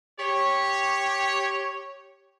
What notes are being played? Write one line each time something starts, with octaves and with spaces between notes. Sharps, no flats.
G4 C#5